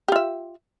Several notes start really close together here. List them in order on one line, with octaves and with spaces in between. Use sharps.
G4 F4 E5